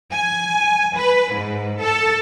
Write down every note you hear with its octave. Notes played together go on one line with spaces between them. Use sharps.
G#5
B4
G#2
A4